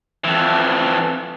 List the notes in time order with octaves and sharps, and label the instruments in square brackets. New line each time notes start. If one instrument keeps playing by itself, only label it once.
[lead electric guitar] F2 E3